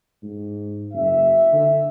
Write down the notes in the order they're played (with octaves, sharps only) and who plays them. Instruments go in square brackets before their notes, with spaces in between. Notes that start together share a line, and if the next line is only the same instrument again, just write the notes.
[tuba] G#2
[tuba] F#1 [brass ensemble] E5
[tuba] D3